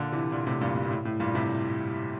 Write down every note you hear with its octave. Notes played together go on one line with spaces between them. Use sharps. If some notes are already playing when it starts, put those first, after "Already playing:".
Already playing: A#2 D3
C3 E3
A#2 D3
A2 C3
G2 A#2
G2
A#2
A2
A2
G2 A#2
A2 C3